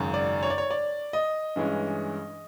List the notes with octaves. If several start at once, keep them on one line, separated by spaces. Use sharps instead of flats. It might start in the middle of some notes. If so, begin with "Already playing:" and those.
Already playing: G#1 F#2 C#3
D5
C#5
D5
C#5
D5
D#5
G2 E3 G#3 C#4